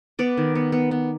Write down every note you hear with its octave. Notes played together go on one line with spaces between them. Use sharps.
B3 B4 D5
D#3
B3
B3
B3